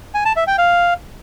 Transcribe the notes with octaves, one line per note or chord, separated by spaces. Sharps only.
G#5
A5
E5
G5
F5